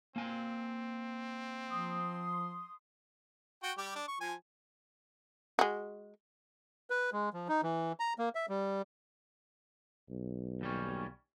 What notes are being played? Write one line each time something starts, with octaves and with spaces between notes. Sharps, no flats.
A#3 C4 G#5
F3 C6 D#6
F#4 G5
G3 G4
D4
C#6
F3 G#5
G#3 F#4
B4
G#3
F3
D#4
E3
A#5
A#3
E5
G3
B1
D#2 G3 C#4